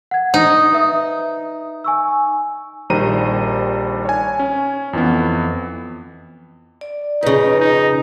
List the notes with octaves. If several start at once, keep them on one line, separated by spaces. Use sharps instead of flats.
F#5 G#6
D#4 C5
B4 E5 D#6
G#5 C#6 E6
A#1 D#3 G3 C5 A#5 D#7
C#5 G#5
C#4
F2 E3 B3
D5
F2 C#3 D#4 B4
D#4